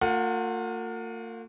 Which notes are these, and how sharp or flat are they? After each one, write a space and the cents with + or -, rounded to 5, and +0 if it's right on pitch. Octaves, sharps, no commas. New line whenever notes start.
A#3 -45 F4 +30 F#5 +0